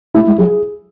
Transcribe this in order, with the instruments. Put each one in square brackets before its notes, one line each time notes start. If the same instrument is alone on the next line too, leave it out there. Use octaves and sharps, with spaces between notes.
[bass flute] A3 [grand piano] E4
[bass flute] G#3
[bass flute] F#3 [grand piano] G#4